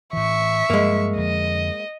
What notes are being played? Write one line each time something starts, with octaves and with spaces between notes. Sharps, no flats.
A2 E3 E5 C#6
G2 F3 G#3 A#3
F2 D3 D#5